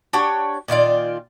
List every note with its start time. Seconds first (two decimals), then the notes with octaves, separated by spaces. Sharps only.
0.13 D4 G4 C#5 F#5
0.68 A#2 D#3 F4 D5